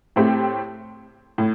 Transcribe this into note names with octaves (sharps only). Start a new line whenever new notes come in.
A2 A3 C4 G4
A2